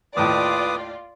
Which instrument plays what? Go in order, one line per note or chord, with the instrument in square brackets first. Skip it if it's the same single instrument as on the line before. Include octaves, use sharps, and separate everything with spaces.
[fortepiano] D#2 A2 [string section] F4 D5 [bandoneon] B4 D6 D#6